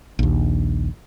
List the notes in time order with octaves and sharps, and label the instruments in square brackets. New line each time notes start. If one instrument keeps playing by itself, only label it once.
[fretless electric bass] A#1 D#2